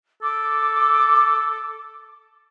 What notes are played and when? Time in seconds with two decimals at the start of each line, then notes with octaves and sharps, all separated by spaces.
0.22 A4 D6